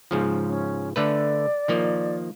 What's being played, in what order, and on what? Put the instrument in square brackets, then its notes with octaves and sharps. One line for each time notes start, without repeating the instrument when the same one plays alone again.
[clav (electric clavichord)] G#2 C#3 F3
[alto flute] C#4
[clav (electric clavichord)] D3 A3 B4 [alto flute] D5
[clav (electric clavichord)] D#3 F3 A#3